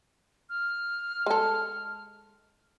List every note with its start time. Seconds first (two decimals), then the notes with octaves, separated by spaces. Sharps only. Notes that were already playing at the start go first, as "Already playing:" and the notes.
0.50 F6
1.26 G#3 A4